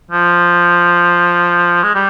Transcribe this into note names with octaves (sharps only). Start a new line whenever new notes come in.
F3
G#3
G3